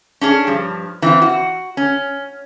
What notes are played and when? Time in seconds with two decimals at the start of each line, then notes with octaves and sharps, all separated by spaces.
0.21 C#4 D4 G#4
0.47 G2 F3
1.02 E3 C4 F4
1.22 F#4
1.77 C#4